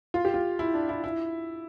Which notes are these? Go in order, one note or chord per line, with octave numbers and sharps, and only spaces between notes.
F4
G4
F4
E4
D4
E4
E4